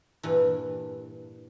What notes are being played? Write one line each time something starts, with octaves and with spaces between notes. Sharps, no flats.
G2 A#2 E3